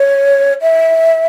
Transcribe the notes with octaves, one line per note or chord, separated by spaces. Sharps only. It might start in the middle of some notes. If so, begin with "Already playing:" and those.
Already playing: C#5
E5